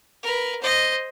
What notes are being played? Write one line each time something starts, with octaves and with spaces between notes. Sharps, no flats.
A#4 B4
C5 D#5